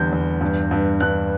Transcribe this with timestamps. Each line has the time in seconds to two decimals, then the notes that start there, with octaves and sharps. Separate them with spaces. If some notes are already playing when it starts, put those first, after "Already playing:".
Already playing: E2 D3 G3 G6
0.13 E2
0.41 G2
0.71 G2
1.00 G2 F#6